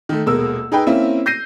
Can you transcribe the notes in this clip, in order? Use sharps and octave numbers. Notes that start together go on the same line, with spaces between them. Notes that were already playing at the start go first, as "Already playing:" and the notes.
D#3 A3
D#1 B2 G#3 A#4 E6
D#4 G#4 B4 G5
A#3 C4 C#4 E4 E5
G6 A#6 C7 D#7